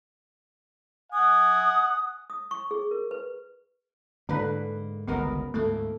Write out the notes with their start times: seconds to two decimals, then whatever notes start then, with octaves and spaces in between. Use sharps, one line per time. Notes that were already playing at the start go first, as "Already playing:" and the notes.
1.12 F#5 G#5 D#6
2.30 D#6
2.51 C#6
2.71 G#4
2.91 A#4
3.11 B4
4.29 G#2 D3 A#3 B4
5.08 G1 C#2 D#3 B3 A#4
5.54 D2 G#2 A3 A#3